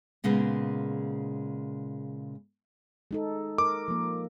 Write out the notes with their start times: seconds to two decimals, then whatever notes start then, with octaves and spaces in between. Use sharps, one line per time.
0.24 A#2 C#3 G#3 A#3 B3
3.11 G#3 D#4 A4
3.58 A#4 D6
3.88 F3 A#3